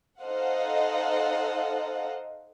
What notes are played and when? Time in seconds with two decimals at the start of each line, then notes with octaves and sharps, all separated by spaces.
0.22 D#4 A4 C5 D#5 F5 F#5